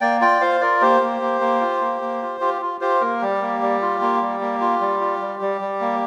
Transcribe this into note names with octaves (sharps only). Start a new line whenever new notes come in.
A#3 D5 G5
F4 D5 G5
F4 C5 F5
F4 A#4 D5
A#3 G4 C5
A#3
A#3
A#3
F4
A#3
A#3
F4
F4 G4
F4
F4 G4 C5
A#3 A#4
G3 G4
A#3
G3
F4
A#3
G3
A#3
F4
G3
F4
G3
G3
G3
A#3